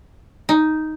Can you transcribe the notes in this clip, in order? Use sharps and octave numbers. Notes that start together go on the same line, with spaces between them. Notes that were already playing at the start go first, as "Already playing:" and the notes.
D#4